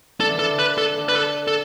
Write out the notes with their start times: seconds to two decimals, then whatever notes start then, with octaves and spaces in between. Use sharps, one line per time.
0.20 D3 A4
0.29 E3
0.39 D3 A4
0.59 B4
0.78 A4
0.97 D3
1.09 B4
1.15 A4
1.48 A4